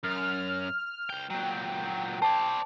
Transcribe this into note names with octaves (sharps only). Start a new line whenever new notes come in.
F#2 F6
C#2 G5
A#2 F#3 G5
C5 D5 A5